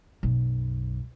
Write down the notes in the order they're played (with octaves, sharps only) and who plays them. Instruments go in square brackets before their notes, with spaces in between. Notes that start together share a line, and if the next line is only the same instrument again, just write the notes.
[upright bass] B1 F#2